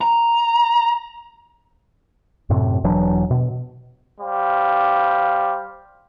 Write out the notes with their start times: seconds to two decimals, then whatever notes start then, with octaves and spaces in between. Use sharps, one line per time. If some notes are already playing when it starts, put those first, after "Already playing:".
0.01 A#5
2.50 F#2 A2 C3
2.84 E1 E3 F#3 D4
3.31 B2
4.19 G3 C5 F5